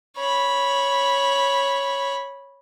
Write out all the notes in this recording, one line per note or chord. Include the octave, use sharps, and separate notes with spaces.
C#5 B5